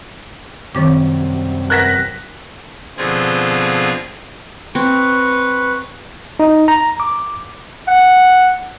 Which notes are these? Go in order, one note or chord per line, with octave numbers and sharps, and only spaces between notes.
F#2 C3 D#3 G3 C4 D6
A#4 B4 F#5 F#6 A#6 B6
B2 D3 F3 C4 F4 G#4
C4 B4 C#6
D#4
A#5
D6
F#5